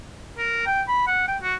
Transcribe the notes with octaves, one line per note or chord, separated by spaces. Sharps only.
A#4
G5
B5
F#5
G5
F#4